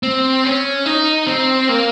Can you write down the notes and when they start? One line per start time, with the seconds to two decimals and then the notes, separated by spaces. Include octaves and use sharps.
0.03 C4
0.44 C#4
0.86 D#4
1.27 C4
1.69 A#3